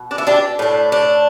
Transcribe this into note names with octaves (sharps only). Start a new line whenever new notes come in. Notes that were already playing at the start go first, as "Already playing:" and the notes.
Already playing: B2
D4
E4
D4 G4
A2 A3 D4
D4